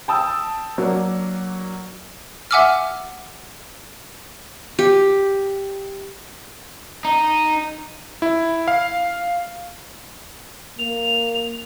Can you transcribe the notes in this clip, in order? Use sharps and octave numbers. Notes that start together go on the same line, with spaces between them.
G5 A5 D#6 E6
F#3 A#3 D4
E5 F#5 G#5 D6 E6 F6
G4
D#4
E4
F5
A#3 F7